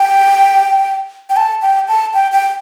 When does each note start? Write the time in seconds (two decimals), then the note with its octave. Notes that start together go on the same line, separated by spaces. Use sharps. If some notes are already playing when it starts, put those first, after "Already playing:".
Already playing: G5
1.30 G5
1.37 A5
1.62 G5
1.88 A5
2.14 G5
2.32 G5